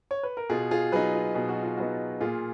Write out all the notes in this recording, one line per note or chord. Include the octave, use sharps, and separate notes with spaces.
C#5
B4
A#4
B2 F4 G#4
F4 G#4
F#3 B3 D#4 G#4 B4
F4
B2 G#4
F#4
F4
F#3 B3 D#4 F#4
A#2 F4 G#4